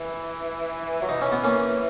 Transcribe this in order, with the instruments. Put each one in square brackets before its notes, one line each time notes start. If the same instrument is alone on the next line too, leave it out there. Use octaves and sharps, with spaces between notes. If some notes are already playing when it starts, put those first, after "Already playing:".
Already playing: [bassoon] E3
F#3
[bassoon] E3 [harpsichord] D#4
[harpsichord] C#4
B3
A#3 C#4